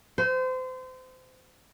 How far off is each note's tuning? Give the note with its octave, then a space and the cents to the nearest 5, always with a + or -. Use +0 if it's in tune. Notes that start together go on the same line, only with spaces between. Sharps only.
C5 -30